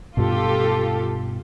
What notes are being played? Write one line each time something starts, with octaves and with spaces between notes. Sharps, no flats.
G2 B2 F4 G4 A4